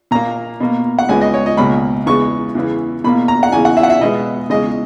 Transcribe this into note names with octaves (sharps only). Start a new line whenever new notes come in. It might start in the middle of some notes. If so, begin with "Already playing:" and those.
A#2 A#3 A#5
B2 A#3
F#5
C#2 C#3 G#3 B3 G#5
D#5
C#5
D#5
C#2 B2 A#3 B5
E2 C#3 G#3 B3 C#6
E2 C#3 E3 B3
E2 B2 A#3 B5
A#5
F#5
E2 C#3 E3 G#5
F#5
E5
F#5
E5
B2 G#3 B3 D#5
E2 C#3 G#3 D#5